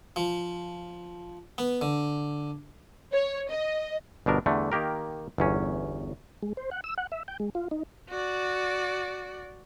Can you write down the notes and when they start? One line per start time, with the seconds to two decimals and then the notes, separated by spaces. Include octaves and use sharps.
0.16 F3
1.58 B3
1.81 D3
3.12 C#5
3.49 D#5
4.26 G1 B2 D4 A#4
4.46 E2 D3 G3 A3
4.72 D#3 A#3 G4 A#4
5.38 G1 E2 C#4
6.42 G#3
6.57 C5
6.71 F#5
6.84 E6
6.98 F#5
7.12 E5
7.28 G5
7.40 G#3
7.55 F4
7.71 D#4
8.09 F#4 D5